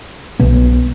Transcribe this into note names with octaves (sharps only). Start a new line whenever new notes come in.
B1 B2 B3